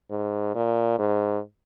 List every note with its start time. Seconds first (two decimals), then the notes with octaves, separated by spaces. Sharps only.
0.10 G#2
0.55 A#2
0.99 G#2